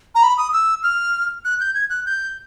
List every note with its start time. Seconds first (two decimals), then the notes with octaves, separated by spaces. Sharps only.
0.15 A#5
0.23 B5
0.37 D#6
0.53 E6
0.83 F6
1.45 F#6
1.60 G6
1.74 G#6
1.90 F#6
2.06 G6